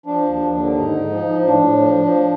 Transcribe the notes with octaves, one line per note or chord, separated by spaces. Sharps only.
F3 D4
D#2
D#2
D3
G#2 D#4
G#2
F3
F3
A2 D4
A2
F3
F3